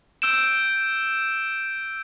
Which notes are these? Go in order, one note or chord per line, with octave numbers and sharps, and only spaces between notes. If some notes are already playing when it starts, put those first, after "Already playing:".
E6 G6 D7 E7